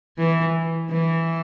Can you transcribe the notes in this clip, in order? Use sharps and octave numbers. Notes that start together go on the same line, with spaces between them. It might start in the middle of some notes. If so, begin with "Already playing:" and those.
E3
E3